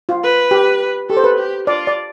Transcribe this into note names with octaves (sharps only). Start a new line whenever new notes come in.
F4
B4
G4
G4 A4
C5
B4
G4
F4 D5
D5